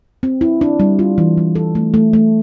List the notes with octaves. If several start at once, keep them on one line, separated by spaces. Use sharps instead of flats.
C4
E4
D4
G3
F4
E3
G3
A4
A3
A3
A3